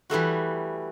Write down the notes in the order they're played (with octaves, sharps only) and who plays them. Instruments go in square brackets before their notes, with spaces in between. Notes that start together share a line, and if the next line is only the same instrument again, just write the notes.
[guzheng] E3 G3 A3 F#4